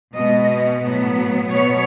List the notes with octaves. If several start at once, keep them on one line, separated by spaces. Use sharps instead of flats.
B2 G#3 B3 D#5
A2 F#3 B3
B2 F#3 B3 C#5